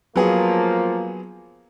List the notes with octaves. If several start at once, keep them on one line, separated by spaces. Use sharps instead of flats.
F3 F#3 A#3 B3 G#4